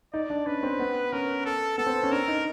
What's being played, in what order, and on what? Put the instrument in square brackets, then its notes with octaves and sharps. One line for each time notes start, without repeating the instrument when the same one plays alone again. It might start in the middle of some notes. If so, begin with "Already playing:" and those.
[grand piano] D#4 [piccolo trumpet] D5
[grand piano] D4
[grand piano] C#4 [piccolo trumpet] B4
[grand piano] C4
B3
[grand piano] C#4 [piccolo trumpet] A#4
[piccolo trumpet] A4
[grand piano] B3 [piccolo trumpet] A4
[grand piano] C4
C#4
[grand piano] D4 [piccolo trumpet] A#4
[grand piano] D#4